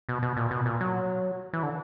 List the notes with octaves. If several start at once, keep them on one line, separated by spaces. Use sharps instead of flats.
B2
B2
A#2
B2
A#2
F#3
E3
D3